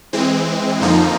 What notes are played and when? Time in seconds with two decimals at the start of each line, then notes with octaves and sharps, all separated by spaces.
0.13 E3 G#3 C4
0.80 F2 D3 F3 A#3 D#4